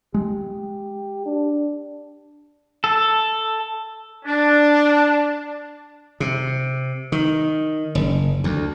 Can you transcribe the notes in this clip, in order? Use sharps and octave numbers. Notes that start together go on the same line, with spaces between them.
G#3 G4
D4
A4
D4
C3
D#3
F#1
D2